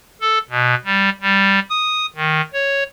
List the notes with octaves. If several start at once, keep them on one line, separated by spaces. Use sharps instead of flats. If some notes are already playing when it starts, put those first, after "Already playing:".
A4
B2
G3
G3
D#6
D#3
C#5